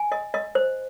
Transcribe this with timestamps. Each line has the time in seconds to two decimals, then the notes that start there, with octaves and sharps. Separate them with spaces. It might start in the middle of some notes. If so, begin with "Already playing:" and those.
Already playing: G#5
0.12 D#5
0.34 D#5
0.55 C5